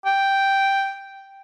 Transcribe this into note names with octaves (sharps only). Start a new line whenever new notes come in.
G5